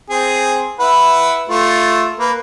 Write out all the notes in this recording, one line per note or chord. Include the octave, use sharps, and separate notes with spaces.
C4 G#4
E4 B4 F#5
A3 F4
A#3 B4